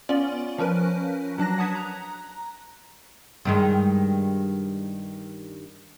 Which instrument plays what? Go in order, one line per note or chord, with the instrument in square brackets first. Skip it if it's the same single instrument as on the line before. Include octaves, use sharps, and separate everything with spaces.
[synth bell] B3 C#4 F4 D5
F3 C#4 A#4 B4 F#6
F#3 D4 F#6 A#6
F#5 A5 D#6 G#6 B6
A#5 F#6
[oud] G2 D#3 G#3